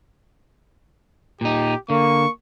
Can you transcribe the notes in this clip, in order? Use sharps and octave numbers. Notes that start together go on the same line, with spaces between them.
A#2 D#4 G4
D3 A#3 C#6